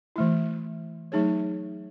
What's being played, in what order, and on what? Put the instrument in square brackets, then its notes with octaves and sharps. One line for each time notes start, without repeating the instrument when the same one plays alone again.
[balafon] E3 A3 E4
F#3 A3 D#4 G#4 C#5